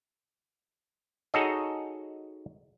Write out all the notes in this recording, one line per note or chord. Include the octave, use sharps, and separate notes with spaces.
D#4 F#4 G#4 A4 C#5 D#5